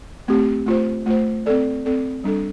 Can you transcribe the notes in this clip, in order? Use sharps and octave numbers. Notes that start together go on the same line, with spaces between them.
A3 C4 G4
A3 F4 C5
A3 F4 C5
C4 A4 D5
C4 A4 D5
G3 D4 A4